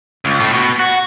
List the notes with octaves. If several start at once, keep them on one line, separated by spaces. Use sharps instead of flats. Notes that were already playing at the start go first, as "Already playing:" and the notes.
C#2
A2
B2
F#4